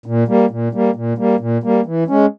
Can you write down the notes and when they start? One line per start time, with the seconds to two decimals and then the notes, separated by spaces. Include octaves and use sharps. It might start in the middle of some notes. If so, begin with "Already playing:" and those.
0.06 A#2
0.28 G3 A#3
0.50 A#2
0.73 G3 A#3
0.95 A#2
1.18 G3 A#3
1.40 A#2
1.63 G3 A#3
1.86 E3
2.08 G#3 C#4